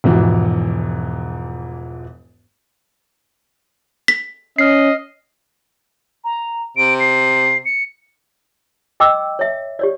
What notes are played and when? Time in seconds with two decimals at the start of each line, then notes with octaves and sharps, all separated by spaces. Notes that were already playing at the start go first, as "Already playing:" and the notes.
0.04 E1 G#2 E3 F3 F#4
4.08 B6
4.59 C#4 D#5 F6 C7
6.24 A#5
6.77 C3 D7
7.00 C7
7.65 C#7
9.00 D#5 G5 D6 E6
9.39 C#5 E5
9.79 G4 C#5 D5